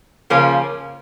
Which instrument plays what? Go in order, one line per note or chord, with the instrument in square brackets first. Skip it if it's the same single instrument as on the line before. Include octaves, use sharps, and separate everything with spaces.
[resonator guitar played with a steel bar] C#3 F3 A#3 C#4